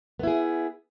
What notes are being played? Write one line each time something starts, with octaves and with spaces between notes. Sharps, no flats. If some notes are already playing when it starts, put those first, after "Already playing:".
B3 E4 G#4